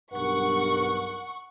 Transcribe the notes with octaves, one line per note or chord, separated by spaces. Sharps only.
B1 G2 A#4 F#5 C#6